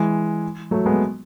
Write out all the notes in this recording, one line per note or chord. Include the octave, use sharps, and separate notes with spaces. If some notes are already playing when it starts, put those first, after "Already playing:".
Already playing: E3 G#3
F#3 A3
G#3 B3